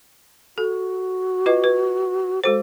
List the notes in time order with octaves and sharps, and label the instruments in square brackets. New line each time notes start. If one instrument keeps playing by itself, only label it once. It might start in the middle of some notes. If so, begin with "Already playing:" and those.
[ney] F#4 [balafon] A4
[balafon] F4 B4 D#5
B4
[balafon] G#3 F#4 C5 [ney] A4